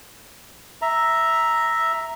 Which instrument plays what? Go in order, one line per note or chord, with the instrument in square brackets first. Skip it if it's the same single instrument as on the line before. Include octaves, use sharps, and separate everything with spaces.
[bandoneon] E5 A#5